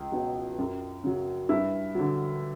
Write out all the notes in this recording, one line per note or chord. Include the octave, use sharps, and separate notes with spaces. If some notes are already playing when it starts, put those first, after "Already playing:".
Already playing: C#2
B2 F#3
F#2
C#3 F#3
G2 E4
D3 F#3